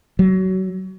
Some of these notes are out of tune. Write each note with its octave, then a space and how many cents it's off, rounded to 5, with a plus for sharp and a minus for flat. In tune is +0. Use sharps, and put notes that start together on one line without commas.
F#3 +25